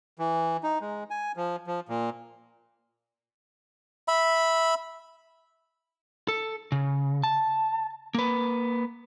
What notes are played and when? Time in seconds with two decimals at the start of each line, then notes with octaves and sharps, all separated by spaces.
0.19 E3
0.63 D#4
0.81 G#3
1.11 G#5
1.36 F3
1.67 F3
1.89 A#2
4.08 E5 B5
6.28 A4
6.72 C#3
7.23 A5
8.15 A#3 B4